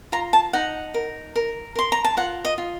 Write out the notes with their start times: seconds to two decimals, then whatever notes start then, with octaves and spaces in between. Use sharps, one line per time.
0.12 F4 A#5
0.33 A5
0.53 D#4 F#5
0.94 A#4
1.36 A#4
1.75 A#4 C6
1.92 A#5
2.04 A5
2.17 F4 F#5
2.45 D#5
2.58 F4